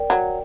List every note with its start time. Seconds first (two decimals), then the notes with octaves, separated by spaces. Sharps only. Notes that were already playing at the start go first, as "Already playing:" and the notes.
Already playing: A#4 D5 G5
0.10 F#3